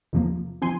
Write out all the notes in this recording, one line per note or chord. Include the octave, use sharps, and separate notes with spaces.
E2 C3 F3 A#3
F3 C4 G#5 C6